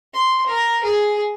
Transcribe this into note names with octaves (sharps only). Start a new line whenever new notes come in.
C6
A#4
G#4